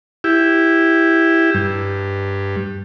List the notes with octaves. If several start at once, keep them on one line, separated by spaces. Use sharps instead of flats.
E4 G4
G2